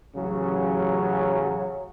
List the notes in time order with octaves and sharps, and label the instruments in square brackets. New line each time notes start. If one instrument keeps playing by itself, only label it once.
[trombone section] A1 C#3 F#3